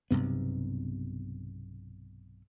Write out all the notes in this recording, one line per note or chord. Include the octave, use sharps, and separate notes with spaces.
B1 G2 C3 B3